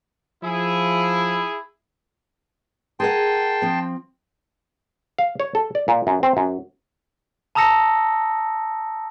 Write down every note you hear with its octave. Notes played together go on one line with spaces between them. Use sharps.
F3 E4 G#4
G#4 A#4 F#5 G5 A5 C6
F3 C4
F5
C#5
A4
D5
A#2
F#2
C4
F#2
A5 A#5 D#6 E6 A#6 C#7